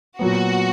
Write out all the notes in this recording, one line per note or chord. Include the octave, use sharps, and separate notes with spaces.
A#2 F#3 B3 F#4